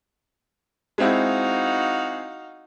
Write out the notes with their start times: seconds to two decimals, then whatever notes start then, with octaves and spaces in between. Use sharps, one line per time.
0.98 G#3 C4 D#4 E4 F#4 F5